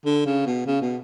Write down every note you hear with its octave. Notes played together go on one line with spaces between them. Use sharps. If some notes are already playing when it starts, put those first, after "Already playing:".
D3
C#3
B2
C#3
B2